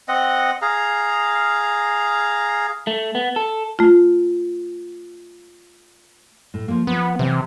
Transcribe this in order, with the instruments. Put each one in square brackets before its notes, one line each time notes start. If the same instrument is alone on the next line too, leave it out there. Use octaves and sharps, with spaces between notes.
[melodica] C4 D#5 F#5
G#4 F5 A#5
[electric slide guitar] A3
B3
A4
[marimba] A3 F4
[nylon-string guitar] A2
F3 A#3
[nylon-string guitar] F3 [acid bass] B3
[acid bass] C3 [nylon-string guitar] E3 B4 E5